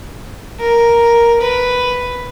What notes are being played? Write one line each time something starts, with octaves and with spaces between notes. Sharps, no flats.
A#4
B4